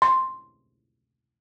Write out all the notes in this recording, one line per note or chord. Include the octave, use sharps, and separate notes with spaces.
C6